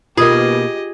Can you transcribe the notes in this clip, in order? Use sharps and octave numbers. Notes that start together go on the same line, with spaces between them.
B2 D#3 A#3 F4 G4 G#4 D#5